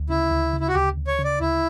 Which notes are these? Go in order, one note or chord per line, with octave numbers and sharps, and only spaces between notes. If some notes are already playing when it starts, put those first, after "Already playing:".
Already playing: D2
C#3 E4
D2
C#3
E4
F#4
D2 G4
D2
C#5
C#3
D5
D2 E4